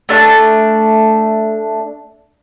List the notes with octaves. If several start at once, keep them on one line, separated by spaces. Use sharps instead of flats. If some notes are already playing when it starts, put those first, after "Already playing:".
A3 D4 A5